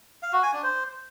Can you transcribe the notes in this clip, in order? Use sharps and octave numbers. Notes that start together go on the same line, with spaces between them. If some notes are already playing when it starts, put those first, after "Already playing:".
F5
F#4
G#5
D4
C5